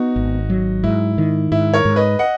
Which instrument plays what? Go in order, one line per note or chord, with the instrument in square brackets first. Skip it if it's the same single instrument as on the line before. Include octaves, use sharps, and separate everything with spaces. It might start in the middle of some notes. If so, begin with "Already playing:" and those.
Already playing: [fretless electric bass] B3 [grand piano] D#4 F#4
[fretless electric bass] G#1
F#3
[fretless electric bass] G#2 [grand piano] E4
[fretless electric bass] D#3
[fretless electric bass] G#2 [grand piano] E4
[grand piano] A#4 C#5
[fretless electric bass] G#2
[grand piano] B4 D#5
D#5 F#5